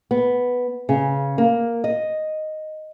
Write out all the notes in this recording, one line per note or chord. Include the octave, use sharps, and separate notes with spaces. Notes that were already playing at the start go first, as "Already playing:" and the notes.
B3
C#3
A#3
D#5